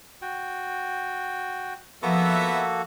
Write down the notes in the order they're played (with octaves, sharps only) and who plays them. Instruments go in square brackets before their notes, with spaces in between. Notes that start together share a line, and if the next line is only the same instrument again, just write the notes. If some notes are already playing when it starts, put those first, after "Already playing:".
[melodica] F#4 G5
[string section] F3 [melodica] A#3 F#4 A4 [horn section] B3 E5